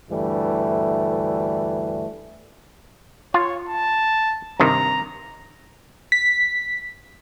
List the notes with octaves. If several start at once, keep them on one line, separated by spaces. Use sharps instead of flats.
D2 G2 E3 G3 A3
F4 C#5
A5
G2 C3 D#3 A#5
B6